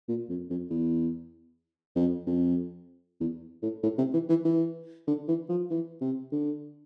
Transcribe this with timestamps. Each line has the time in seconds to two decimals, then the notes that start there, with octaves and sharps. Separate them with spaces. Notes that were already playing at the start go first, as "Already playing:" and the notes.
0.08 A#2
0.29 F2
0.50 F2
0.70 E2
1.96 F2
2.27 F2
3.20 E2
3.62 A2
3.83 A2
3.98 C3
4.13 E3
4.29 E3
4.45 E3
5.07 D3
5.28 E3
5.49 F3
5.70 E3
6.01 C3
6.32 D3